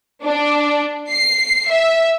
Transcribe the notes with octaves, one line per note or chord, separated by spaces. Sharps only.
D4
C7
E5